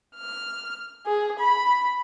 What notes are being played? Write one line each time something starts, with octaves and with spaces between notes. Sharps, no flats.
F6
G#4
B5